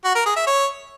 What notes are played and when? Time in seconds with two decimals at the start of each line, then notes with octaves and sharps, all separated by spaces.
0.05 F#4
0.15 A#4
0.26 G#4
0.36 E5
0.47 C#5